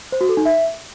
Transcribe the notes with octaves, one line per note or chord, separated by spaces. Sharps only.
C5
F#4
A4
D#4
E5